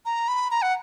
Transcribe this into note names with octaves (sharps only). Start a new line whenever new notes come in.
A#5
B5
A#5
F#5